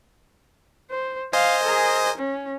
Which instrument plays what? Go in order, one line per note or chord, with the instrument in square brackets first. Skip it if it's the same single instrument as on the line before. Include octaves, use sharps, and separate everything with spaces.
[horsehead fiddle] C5
[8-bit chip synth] C5 D#5 G#5 [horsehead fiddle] F5
[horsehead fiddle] G#4 A#4
C#4